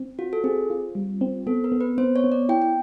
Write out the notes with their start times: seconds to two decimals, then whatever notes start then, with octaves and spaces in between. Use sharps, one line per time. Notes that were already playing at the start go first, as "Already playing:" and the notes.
Already playing: C4
0.19 F4 F#4
0.33 A4
0.44 C4 G#4
0.70 F4
0.95 G3
1.21 C4
1.47 B3 A4
1.64 A#4
1.72 B3
1.81 B4
1.98 B3 C5
2.16 C#5
2.24 B3
2.32 D5
2.49 E4 G5
2.62 G5